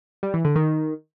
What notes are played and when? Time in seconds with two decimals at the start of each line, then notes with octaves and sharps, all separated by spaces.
0.23 G3
0.34 E3
0.45 D3
0.56 D#3